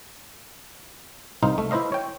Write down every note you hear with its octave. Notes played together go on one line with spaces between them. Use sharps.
C2 D#4 C5 F5
A3
E4 B4 C5 D#5 F5
C#5 G5